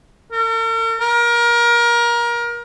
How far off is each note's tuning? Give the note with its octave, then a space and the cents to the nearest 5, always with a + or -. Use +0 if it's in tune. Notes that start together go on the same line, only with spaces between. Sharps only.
A#4 -45
A#4 +25